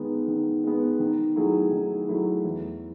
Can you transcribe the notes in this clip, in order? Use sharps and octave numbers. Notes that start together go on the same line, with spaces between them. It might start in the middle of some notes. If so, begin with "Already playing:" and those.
Already playing: D#3 G#3 B3
D#3
G#3 B3
D#3
F#3 A3 E4 G#4
D#3
F#3 A3 E4 G#4
E2